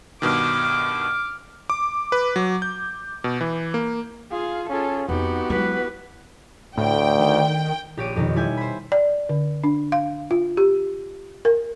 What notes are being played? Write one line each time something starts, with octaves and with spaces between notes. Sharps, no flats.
G2 B2 D#3 D6 F6
D6
B4
F#3
G6
B2
E3
A#3
F4 G#4 F5
C#4 F4 G#4 A4
F2 B3 D#4 F#4 G4
F#3 G#3 E4 B4
D2 A2 G5
D#3
A#1 G4 C#5 D7 D#7
F2 B2 D#3
G3 E4 G#5 G6
C5 B5
D5
D3
D4
F5
F4
G4
A#4